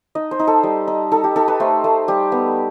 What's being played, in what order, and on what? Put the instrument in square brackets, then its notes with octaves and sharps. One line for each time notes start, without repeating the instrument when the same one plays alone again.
[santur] D#4 D#5
C5
D#4
A4
G3
D#4
D#4 A4
G4
D#4 A4
B4
A3 C5
A3
G3 G4
B3